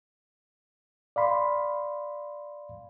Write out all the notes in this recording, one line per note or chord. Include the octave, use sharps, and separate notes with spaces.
D5 F5 B5 C6